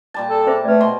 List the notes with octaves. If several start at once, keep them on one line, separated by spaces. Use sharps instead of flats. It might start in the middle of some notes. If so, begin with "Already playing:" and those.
A#2 G3 A5
A4
G#4 C5 E5
A3 B4 D5
B2 C6